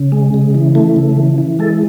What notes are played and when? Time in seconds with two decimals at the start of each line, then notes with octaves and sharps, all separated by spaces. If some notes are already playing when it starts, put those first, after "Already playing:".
Already playing: C#3
0.12 G#3
0.34 C#3
0.55 E3
0.75 A3
0.96 C#3
1.17 E3
1.38 E3
1.59 G#3 A4